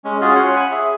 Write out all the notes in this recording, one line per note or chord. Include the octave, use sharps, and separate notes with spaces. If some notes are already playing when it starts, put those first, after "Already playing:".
G#3 C#4
C#4 F4 F#4 G#4
C#4 C#5 F#5 C6
G#5 B5
G#4 E5